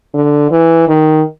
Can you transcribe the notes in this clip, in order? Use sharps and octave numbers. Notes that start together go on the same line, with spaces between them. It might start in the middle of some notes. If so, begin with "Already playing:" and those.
D3
E3
D#3